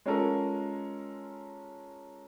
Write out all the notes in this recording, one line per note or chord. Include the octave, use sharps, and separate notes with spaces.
G#3 C#4 F4 A4 A#4